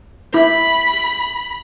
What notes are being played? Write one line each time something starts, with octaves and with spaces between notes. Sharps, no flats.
E4 B5